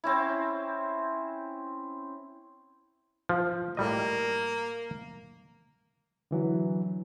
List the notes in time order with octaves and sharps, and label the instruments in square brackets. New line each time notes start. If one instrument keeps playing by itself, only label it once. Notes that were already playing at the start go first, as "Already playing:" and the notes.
[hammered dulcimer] C4 C#4 E4
[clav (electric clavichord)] F3
[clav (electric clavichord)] A2 G3 D#5 [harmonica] A#3
[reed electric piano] D3 E3 F#3